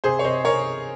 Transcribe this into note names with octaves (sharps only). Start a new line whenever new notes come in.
C3 G#4 C5
C#5
C3 C5 D#5
C3 A#4 C#5